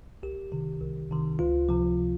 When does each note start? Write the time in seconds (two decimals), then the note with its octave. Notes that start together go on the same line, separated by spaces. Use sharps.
0.23 C2 G4
0.52 C3 D#3
0.81 C2
1.11 C3 D#3
1.39 C#2 F4
1.69 C3 F3